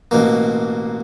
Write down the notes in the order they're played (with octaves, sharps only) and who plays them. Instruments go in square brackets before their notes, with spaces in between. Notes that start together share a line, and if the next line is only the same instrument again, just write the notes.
[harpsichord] A1 B2 A#3